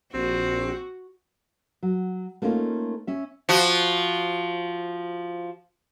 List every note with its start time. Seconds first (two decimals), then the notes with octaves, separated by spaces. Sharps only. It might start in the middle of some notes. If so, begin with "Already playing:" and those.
0.14 A#1 C4 F#4
1.83 F#3
2.42 A3 A#3 C#4 D#4 F4
3.07 C#4 E5
3.49 F3 F#4